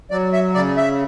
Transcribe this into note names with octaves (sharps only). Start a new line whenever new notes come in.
F#3 D5
E5
C#3 D5
E5